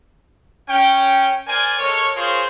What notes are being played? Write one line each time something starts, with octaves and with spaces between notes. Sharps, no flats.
C#4 G5
A#4 C5 D5 G#5
G#3 A4 A#4 C#5
F4 G#4 A#4 C5 C#5 C6